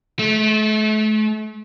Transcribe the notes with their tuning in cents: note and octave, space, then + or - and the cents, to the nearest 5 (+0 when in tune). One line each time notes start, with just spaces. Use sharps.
A3 -35